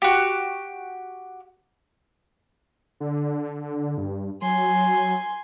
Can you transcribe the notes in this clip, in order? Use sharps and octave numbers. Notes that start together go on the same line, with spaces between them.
F#4 G4
D3
G2
F#3 G#5 C6